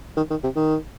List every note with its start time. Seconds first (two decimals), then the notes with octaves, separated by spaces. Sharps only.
0.16 D#3
0.30 D#3
0.43 C3
0.56 D#3